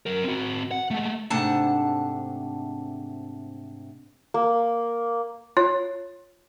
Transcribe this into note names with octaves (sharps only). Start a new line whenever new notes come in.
F#3 A#4
C4 F#4
F#5
G#3 A3
G#2 C3 A3 D4 F#5 A5
A#3
F4 C#5